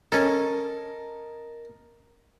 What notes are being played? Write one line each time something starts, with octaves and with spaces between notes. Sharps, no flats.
C#4 A4 A#4 D#5 A5